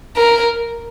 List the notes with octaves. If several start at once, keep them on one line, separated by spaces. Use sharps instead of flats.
A#4